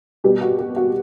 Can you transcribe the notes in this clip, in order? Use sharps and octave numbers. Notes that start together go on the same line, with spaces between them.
B2 G3 G4
F#4
G4
F#4